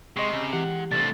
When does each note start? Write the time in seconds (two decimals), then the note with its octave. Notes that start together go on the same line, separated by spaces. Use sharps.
0.17 C3 G#3 D#5 C6 C#6 C7
0.33 C#3
0.53 E3 G#3 G4 F#5
0.91 C2 F3 A3 D4 A6